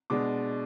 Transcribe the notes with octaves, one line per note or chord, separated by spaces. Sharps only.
B2 G#3 D4 D6